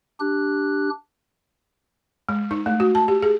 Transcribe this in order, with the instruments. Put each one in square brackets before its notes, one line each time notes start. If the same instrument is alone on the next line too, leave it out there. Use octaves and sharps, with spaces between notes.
[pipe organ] D4 G4 F#6
[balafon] G#3
D#4
A3
F#4
A5
G4
G#4